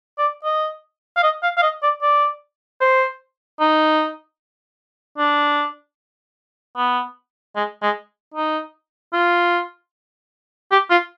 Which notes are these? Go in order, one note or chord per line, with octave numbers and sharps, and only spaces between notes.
D5
D#5
F5
D#5
F5
F5
D#5
D5
D5
C5
D#4
D4
B3
G#3
G#3
D#4
F4
G4
F4